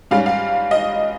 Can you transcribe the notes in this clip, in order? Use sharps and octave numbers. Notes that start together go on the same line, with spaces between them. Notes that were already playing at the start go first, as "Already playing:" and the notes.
G#2 G3 C#4 F5
F5
D#5